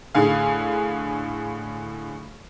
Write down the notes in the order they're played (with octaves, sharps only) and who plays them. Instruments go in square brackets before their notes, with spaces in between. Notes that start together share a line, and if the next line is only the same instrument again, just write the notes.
[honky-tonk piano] A2 D3 G#4 F5